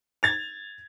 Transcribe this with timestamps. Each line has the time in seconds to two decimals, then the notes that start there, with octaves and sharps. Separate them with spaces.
0.23 G#6 A6 F7